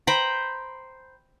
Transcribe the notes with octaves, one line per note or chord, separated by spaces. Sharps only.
C5 G5 A#5 B5